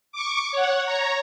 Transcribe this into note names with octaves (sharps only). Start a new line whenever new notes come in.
C#6 D6
C#5 F#5
C#5 A#5